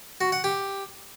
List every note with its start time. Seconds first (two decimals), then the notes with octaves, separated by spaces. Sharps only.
0.21 F#4
0.32 F#5
0.44 G4